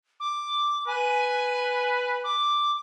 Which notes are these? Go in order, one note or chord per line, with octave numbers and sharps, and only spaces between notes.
D6
B4 G#5
D6